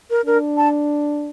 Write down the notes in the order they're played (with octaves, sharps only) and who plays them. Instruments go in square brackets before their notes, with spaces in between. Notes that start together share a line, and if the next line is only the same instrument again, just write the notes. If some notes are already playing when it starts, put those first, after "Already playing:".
[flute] A#4
[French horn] D4 [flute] A#4
[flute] A5